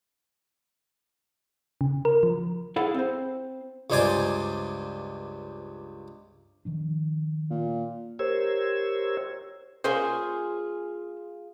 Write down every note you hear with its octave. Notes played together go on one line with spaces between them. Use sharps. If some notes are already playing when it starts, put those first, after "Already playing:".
C#3
A#4
F3
E4 G#4 A4 F5 F#5
C4 C5
C#2 G2 D#4 C5 D5 G#5
D#3 F3 D4
A#2
G4 A#4 C5 C#5 E6 G#6
A#3 C#4 F4 G#4 C5